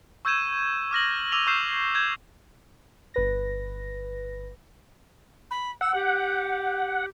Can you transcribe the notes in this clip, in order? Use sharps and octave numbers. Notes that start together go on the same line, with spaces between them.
C#6 E6 G6 G#6 D#7 E7
D6 F6 A#6 F#7
D6 E6 A#6 D#7 F7 G7
C#6 E6 F6 G6 C7 E7
G6 G#6 E7
G1 B4 A#6
B5
F#5 E6
G4